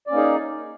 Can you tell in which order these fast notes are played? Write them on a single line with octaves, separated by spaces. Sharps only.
D5 C#4 A#3 D#4 G#4